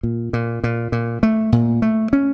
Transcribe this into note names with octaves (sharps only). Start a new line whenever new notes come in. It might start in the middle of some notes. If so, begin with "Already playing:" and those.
A#2
A#2
A#2
A#2
A3
A#2
A3
C#4